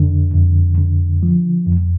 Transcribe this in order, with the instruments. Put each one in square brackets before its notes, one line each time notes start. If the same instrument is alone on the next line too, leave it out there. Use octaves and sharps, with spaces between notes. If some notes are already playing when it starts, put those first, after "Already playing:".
Already playing: [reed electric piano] F2 D3
F2
D3
F3
F2